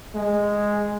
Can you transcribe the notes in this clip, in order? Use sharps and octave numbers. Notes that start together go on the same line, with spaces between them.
G#3